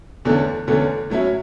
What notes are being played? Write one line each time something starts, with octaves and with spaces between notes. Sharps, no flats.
E2 D3 A3 C#4
E2 D3 A3 C#4
A2 F#3 C#4 E4